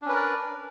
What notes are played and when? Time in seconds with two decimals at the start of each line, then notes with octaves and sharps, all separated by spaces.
0.02 D4
0.05 C#4
0.09 B4
0.13 A#4
0.16 D5